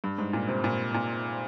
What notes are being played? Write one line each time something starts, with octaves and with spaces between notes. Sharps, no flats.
G2
G#2
A#2
C3
A#2
A#2